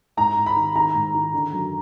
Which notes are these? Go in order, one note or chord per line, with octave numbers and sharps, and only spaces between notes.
G#2 A#5
G#2
B5
D#3
D#3 A#5
G#2
D#3
D3
F#2